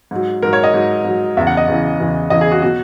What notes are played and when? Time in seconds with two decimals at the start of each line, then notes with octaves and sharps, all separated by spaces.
0.11 G#2 F#3
0.42 G#2 F#3 A#4
0.53 C#5
0.64 D#5
0.74 G#2 F#3
1.05 G#2 F#3
1.37 E2 C#3 E3 E5
1.47 F#5
1.57 D#5
1.68 E2 C#3 E3
2.00 E2 C#3 E3
2.30 E2 C#3 E3 D#5
2.41 G#4
2.52 F#4
2.62 B2 F#3 F#4